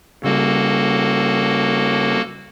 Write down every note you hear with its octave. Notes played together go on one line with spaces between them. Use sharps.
C#3 G3 A#3 F#4 A4